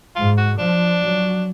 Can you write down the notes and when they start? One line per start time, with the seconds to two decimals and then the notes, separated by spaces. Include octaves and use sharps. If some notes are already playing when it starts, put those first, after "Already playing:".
0.16 G#2 F4
0.37 F#4
0.58 F3 D4
1.01 F#3